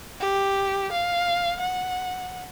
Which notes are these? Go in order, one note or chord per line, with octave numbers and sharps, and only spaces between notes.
G4
F5
F#5